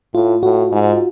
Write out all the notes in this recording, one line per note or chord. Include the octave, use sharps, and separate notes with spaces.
A2 F4
A2 F#4
G#2